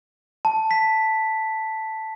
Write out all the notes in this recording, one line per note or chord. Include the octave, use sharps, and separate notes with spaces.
A5
B6